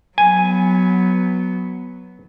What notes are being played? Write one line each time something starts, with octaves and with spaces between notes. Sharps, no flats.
F#3 B3 G#5